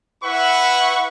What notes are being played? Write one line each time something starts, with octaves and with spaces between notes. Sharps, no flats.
E4 B4 E5 F#5 B5 C#6